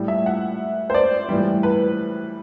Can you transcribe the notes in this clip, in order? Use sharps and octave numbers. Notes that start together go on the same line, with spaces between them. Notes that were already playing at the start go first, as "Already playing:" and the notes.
Already playing: A2 G3
E5
F#5
C5
D5
A2 E3 G3
B4